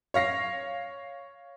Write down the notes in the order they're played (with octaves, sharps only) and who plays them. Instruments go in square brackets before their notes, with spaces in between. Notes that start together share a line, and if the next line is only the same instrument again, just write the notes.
[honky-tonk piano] C#5 F5 A#6 C7